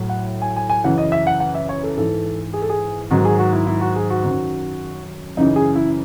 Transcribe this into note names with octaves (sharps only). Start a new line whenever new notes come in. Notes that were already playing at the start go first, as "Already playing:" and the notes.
Already playing: A2 F#3
F#5
G#5
G#5
G#5
F#2 C#3 E3 F#5
D#5
E5
F#5
F#5
E5
C#5
A4
G#2 E3 A4
G#4
A4
G#4
G#2 D#3 F#3 F#4
G#4
F#4
E4
E4
F#4
G#4
F#4
F#2 D#3 F#3
F#2 C#3 E3 D#4
G#4
E4